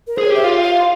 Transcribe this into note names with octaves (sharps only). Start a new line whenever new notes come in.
A#4
G#4 C5
C#5
G4 E5
F4 F5
F5